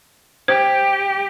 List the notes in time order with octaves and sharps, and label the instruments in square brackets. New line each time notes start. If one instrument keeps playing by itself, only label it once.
[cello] G4 [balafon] C5